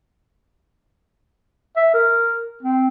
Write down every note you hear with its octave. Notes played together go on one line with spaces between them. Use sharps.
E5
A#4
C4